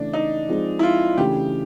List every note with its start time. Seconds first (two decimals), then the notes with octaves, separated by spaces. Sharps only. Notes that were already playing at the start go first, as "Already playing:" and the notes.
Already playing: C#3 E3 A3 D4
0.13 D#4
0.49 F3 G#3 C4 D#4 G#4
0.79 E4
0.83 F4
1.18 C#3 E3 A3 D4 G4